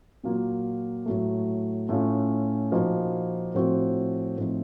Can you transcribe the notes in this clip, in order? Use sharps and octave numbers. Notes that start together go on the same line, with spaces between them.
A#2 F#3 A#3 F4
A2 F#3 A3
A2 A3 C#4 F4
A#2 F3 A#3 D#4 F#4
A2 F3 C4 F#4
A2 F3 C4 D#4